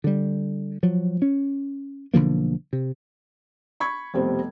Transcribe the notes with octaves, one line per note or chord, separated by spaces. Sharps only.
D3 G3
F3 F#3
C#4
B1 D3 F3 A#3
C3
B5 C#6 G#6
F1 B2 G3 C4 C5